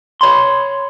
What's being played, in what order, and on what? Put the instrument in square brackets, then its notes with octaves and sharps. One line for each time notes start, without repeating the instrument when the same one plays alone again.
[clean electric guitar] C#5 B5 C6